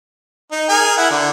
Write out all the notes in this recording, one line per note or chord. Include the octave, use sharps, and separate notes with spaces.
D#4
G#4 A#4 G#5
E4 F#5
D3